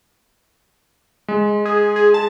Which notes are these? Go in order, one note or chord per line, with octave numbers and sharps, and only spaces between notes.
G#3
G#4
G#4
A5